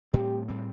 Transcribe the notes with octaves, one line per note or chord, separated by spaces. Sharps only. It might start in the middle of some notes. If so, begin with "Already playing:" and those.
A2 G3 C4 G4
A2 G3 C4